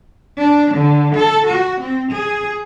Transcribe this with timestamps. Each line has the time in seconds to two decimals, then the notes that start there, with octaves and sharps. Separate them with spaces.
0.38 D4
0.74 D3
1.15 A4
1.47 F#4
1.81 C4
2.11 G#4